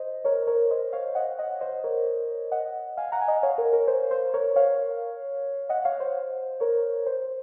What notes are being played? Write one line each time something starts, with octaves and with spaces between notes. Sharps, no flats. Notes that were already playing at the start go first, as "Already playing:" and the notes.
Already playing: C5 D#5
A#4 C#5
A#4 C#5
C5 D#5
C#5 F5
D#5 F#5
D#5 F#5
C5 D#5
A#4 C#5
D#5 F#5
F5 G#5
F#5 A#5
G#5
D#5 F#5
C#5 F5
A#4
A#4
C5
C5
A#4 C#5
C#5 F5
D#5 F#5
C#5 F5
C5
A#4 C#5
C5